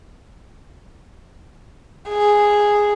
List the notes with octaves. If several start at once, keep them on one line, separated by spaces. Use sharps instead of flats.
G#4